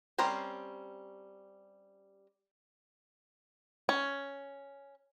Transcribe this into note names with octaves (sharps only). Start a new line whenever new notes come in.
G3 C4 C#4 A#4 C5
C#4